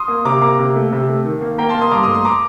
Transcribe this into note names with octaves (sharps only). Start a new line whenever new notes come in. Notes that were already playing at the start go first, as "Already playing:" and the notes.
Already playing: C6 D#6
A#3
C3 A#5 D6
A#3 A#5 D6
C3
A3
C3
A3
D#3
A#3
A#3 G5 A#5
A5 C6
A#3
C6 D#6
G2 A#5 D6
C6 D#6
A3
C6 D#6
A#5 D6